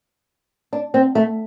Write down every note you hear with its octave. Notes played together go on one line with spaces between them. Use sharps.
D4
C4
A3